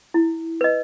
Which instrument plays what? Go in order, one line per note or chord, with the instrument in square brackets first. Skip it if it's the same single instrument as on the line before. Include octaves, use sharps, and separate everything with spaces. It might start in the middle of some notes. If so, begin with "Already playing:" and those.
[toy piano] E4
B4 D#5